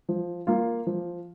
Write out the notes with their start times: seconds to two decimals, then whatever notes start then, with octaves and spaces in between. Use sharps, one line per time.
0.09 F3
0.47 A#3 F4
0.87 F3